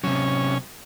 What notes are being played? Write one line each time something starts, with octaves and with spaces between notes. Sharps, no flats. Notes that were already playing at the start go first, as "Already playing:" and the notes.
C3 F#3 C#4